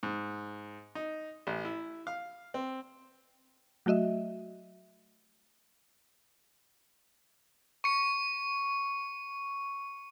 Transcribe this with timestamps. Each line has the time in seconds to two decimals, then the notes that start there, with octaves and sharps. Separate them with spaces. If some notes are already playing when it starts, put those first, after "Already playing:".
0.03 G#2
0.95 D#4
1.47 A1
1.65 E4
2.07 F5
2.54 C4
3.86 F#3 A3 F#4 D#5 E5
7.84 C#6 C#7